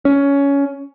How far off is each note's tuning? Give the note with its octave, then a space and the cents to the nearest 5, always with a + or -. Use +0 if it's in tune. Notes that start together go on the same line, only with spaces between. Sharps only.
C#4 +15